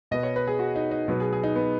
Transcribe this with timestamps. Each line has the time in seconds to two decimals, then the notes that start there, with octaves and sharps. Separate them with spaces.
0.11 B2 B3 D#5
0.23 C#5
0.36 B4
0.47 G#4
0.59 F#4
0.76 D#4
0.91 D#4
1.08 B2 F#3 B3
1.20 G#4
1.33 G#4
1.44 D#4
1.56 B3